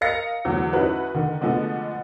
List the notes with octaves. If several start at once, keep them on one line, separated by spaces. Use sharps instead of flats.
A#4 D#5 F5 A#6 C#7
E2 D3 F#3
C#4 D#4 E4 F#4 B4
D3 D#3
B2 D3 F3 G#3 A3 B3